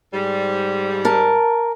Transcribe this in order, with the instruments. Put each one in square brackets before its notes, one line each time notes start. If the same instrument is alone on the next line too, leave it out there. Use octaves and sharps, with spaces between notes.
[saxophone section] G#2 G3
[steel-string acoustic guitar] A#4 A5